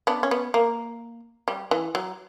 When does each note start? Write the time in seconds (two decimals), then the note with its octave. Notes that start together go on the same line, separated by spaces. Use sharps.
0.07 B3 D4
0.23 C#4
0.31 B3
0.54 A#3
1.48 G3
1.71 E3
1.95 F#3